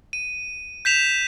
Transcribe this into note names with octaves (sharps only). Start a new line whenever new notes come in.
D#7
G6 B6 E7 F7